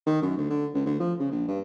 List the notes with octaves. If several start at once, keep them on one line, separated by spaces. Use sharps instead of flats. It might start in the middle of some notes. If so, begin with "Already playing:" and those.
D#3
F#2
D2
D3
C#2
D2
F3
C#3
A#1
G2